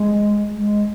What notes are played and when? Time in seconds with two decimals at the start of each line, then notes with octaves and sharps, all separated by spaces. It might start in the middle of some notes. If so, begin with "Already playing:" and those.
Already playing: G#3
0.56 G#3